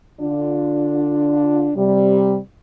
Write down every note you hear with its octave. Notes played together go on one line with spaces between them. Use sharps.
D3 D4 F4
C3 G3